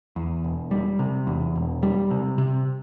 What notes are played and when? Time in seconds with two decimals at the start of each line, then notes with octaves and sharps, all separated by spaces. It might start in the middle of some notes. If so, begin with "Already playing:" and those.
0.16 E2
0.44 E1
0.71 G3
0.99 C3
1.27 E2
1.56 E1
1.83 G3
2.11 C3
2.38 C3